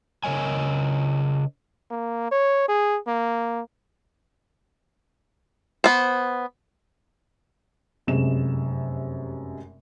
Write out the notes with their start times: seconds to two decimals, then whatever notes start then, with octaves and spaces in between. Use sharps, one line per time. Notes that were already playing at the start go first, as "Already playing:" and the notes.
0.24 C#3 A#4 C#5 D#5 G#5
1.91 A#3
2.31 C#5
2.68 G#4
3.07 A#3
5.84 B3 C5
8.07 F1 F#2 C3 G#3 E7